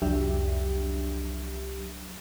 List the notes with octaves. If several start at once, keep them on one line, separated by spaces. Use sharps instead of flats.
C2 F2 F#3 D4 G4 E5